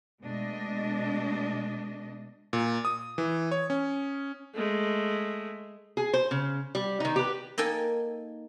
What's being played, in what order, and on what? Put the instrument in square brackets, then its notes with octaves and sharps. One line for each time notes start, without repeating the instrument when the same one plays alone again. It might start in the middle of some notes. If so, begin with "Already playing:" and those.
[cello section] B2 G#3 A3 D4 D#5
[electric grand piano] A#2
D#6
E3
C#5
C#4
[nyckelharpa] G#3 A3
[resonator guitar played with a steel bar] G#4
C5
C#3
G3
D#3 D#4
G4 B4
[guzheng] A#3 D#4 A4 G5 G#5